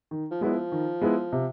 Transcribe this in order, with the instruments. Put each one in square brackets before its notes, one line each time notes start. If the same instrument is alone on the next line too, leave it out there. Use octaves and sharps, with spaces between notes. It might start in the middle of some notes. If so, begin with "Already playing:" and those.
[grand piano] D#3
[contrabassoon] F3
[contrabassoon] F#3 [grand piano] G#3 B3 E4
[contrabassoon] F3
[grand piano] D#3
G#3 B3 E4
C3